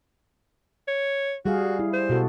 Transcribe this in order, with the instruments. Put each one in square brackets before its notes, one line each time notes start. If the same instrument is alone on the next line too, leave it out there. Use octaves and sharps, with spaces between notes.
[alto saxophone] C#5
[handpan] G3 G#4 F5 [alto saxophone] F#4
[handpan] E4
[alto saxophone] C5
[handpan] B2 F#4 A4